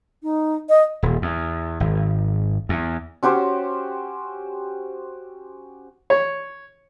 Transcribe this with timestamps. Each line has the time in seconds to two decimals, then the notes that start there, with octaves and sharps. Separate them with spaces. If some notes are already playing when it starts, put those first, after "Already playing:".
0.23 D#4
0.69 D#5
1.03 D#1
1.22 E2
1.80 G#1
2.69 E2
3.23 C#4 F#4 G4 C5
6.10 C#5